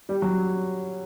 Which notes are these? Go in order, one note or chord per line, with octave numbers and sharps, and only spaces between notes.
G3
F#3